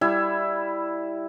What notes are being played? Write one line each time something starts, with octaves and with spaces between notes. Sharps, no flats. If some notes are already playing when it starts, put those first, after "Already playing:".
G3 E4